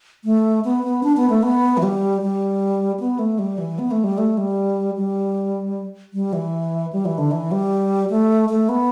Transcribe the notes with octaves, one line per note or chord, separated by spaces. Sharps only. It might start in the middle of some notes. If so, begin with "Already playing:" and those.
A3
B3
B3
D4
B3
A3
B3
E3
G3
G3
B3
A3
G3
E3
B3
A3
G3
A3
G3
G3
G3
E3
G3
E3
D3
E3
G3
A3
A3
B3